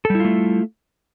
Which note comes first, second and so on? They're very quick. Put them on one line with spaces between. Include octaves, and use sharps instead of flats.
A4 G3 E4 F4 A3